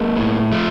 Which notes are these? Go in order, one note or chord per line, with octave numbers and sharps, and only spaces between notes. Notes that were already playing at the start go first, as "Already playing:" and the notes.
Already playing: G#3 A#3
A2
F3 A3